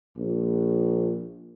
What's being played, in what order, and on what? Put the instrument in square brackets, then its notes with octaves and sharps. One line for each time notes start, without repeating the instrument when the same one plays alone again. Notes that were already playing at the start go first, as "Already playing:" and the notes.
[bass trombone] A#1